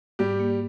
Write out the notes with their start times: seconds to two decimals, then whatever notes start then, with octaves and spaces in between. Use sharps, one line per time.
0.19 G#2 G3 G4
0.40 A#3